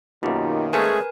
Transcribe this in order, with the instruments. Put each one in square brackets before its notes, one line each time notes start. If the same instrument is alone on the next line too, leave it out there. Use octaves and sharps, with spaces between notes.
[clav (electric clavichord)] F#2 B2 [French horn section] D#3 A#3 [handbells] D#4 F4 G4
[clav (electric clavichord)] G#3 A3 C#4 [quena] G#4 [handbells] A#4 B4 G#5